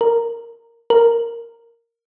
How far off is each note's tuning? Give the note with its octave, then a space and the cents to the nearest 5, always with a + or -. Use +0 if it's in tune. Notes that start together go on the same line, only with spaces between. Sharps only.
A#4 -5
A#4 -5